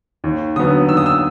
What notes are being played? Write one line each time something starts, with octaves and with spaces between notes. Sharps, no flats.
D#2
D3 F#3 B3 D#6
D#2 E6
D#6
E6